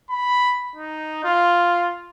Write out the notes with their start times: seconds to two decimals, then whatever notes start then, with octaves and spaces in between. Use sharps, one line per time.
0.11 B5
0.76 D#4
1.24 F4